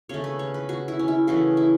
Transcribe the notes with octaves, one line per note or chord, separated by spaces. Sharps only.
C#3 A3 C#5
B4
C#5
B4
F#4
E4
C#4
E4
C#3 E3 A3 F#4
E4